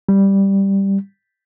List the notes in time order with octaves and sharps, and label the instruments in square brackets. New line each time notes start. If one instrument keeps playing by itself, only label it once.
[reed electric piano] G3